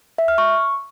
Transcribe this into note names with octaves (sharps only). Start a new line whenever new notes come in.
E5
F6
C#6